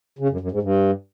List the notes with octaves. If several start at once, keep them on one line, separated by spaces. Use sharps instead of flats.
C#3
F#2
F#2
G#2
G2